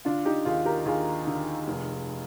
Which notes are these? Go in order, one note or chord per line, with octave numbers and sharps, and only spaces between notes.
D3 D4 F4
D#4 G4
D#2 F4 G#4
G4 A#4
D#2 F4 G#4
D3
F1